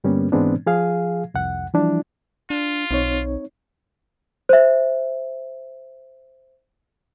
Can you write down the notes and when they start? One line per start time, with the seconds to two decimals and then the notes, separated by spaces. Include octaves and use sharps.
0.04 G2 D3 G3 A#3 B3 C#4
0.32 G#2 E3 G#3 B3 C4 D4
0.66 F3 G#4 F5
1.34 C2 F2 F#5
1.74 E3 F3 G3 D4 E4
2.50 D4 F4
2.91 B1 C4 D#4 C#5
4.49 C5 E5